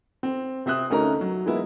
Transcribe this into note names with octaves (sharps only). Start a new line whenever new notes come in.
C4
C3 C4 E5 D#6 F#6
D2 A3 C#4 D#4 A#4 A#5
F#3
E3 G#3 A#3 B3 E4